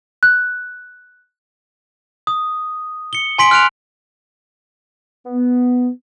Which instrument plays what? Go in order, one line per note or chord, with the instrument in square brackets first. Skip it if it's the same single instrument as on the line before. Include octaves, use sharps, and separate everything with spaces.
[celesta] F#6
[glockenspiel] D#6
C#7 G7
G#5 C6 B6 D7 F#7
F6 F#6 D7 F7
[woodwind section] B3